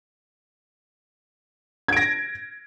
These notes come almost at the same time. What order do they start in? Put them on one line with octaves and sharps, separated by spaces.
G#6 D7 A#6